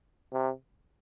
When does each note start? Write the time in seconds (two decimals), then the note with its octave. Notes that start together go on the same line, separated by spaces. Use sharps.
0.33 C3